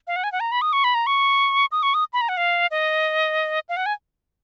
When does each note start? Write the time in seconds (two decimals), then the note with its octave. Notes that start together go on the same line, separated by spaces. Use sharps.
0.07 F5
0.16 F#5
0.24 G#5
0.32 F#5
0.40 A#5
0.52 B5
0.62 D#6
0.73 C#6
0.84 B5
0.95 A#5
1.07 C#6
1.72 D#6
1.83 C#6
1.94 D#6
2.13 B5
2.21 A#5
2.29 F#5
2.37 F5
2.71 D#5
3.69 F5
3.77 F#5
3.86 G#5